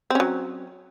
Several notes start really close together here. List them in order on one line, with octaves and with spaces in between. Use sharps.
C4 C#4 F#3